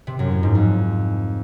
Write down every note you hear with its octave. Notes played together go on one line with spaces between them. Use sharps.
C3
F#2
A2
G#2
F2